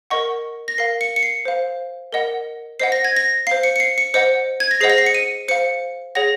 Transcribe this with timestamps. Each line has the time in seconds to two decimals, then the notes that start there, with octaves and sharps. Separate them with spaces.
0.10 A#4 D#5 F#5 C#6
0.68 A#6
0.78 A#4 F5 C7
1.01 C#7
1.16 C#7
1.23 C7
1.45 C5 F5
2.13 A#4 D#5 F#5
2.80 C5 D#5 F#5 C7
2.92 A#6
3.05 G#6
3.16 A#6
3.47 C5 F5 C7
3.63 C#7
3.76 C#7
3.80 C7
3.98 C#7
4.14 C5 D#5 F#5 C#7
4.60 G#6
4.71 A#6
4.81 G#4 C5 D#5 F#5 C7
4.90 A#6
4.98 C7
5.06 C#7
5.15 D#7
5.48 C5 F5 C#7
6.15 G#4 C#5 F#5 A#6